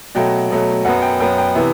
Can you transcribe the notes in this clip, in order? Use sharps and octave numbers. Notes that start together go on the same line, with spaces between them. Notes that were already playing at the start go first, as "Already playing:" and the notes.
B2 F#3 A3 G5
B2 F#3 A3
F#2 F#3 B3 F#5
G5
F#2 F#3 B3 G5
G5
C3 E3 B3